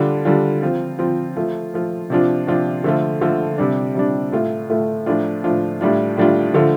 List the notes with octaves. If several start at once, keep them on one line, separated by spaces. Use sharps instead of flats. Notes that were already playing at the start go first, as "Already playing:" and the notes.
Already playing: D3 G3 D4 F4
D3 G3 D4 F4
F3 C4 F4
F3 C4 F4
F3 A3 F4
F3 A3 F4
C3 F3 D4 F4
C3 F3 D4 F4
D3 F3 A3 F4
D3 F3 A3 F4
C3 G3 D4
C3 G3 D4
A2 A3 F4
A2 A3 F4
A2 F3 D4 F4
A2 F3 D4 F4
A2 G3 D4 F4
A2 G3 D4 F4
D3 F3 A3 F4